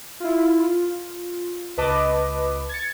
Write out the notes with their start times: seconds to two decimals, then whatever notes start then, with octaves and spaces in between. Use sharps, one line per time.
0.20 E4 F4
0.59 F4
1.77 C#2 B4 D#5 A5 D6
2.69 G#6 A6 C#7